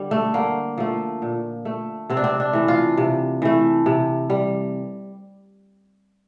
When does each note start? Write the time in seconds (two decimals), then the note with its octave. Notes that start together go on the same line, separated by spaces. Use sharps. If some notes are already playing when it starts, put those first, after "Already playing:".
Already playing: D3 G3
0.11 A3
0.34 D3 A#3
0.78 F3 A3
1.22 A#2
1.65 A3
2.10 C3 C4
2.17 D4
2.24 C4
2.40 D4
2.53 E3 A3
2.68 F4
2.97 C3
3.42 E3 A3
3.86 C3
4.30 G3